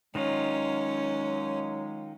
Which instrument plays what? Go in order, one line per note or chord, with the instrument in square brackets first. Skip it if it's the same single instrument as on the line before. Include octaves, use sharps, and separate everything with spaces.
[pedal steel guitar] D#3 D#4 F4 [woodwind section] F#3 G#3 [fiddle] C#4